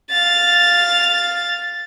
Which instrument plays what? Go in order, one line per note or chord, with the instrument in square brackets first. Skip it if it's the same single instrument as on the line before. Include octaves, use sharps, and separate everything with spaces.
[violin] F5 A6